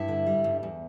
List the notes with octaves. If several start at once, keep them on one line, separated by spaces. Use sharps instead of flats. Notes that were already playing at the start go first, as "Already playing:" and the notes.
Already playing: G2 E4 E5
D3
G3
G2
E2